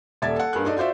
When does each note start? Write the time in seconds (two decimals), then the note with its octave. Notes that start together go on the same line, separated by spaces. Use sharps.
0.22 D#1 A4 D5 E5 G#6 A6
0.36 A4 F#5
0.53 G2 A#3 G#4 F#6
0.65 D4 D#4 A4 D5 D#5
0.76 F4 F#4 C5 D5 E5